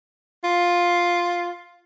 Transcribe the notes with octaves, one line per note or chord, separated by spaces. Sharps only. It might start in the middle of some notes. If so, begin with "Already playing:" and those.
F4